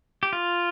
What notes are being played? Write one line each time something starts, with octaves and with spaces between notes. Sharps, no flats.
G4
F4